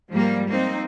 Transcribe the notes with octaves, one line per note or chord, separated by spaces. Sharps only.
G#2 F3 G3 A#3
A#3 C4 D#4